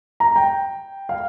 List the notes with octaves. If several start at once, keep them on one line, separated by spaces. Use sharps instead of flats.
A#5
G5
F5